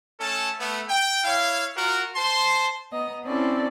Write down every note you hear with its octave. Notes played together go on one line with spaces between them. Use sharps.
A3 C#4 A4 A5
A3 B3
G5
E4 C#5 F5
F4 F#4 A#4
C5 A5 C6
B3 D#5 A#5
C4 C#4 E4 A4 D5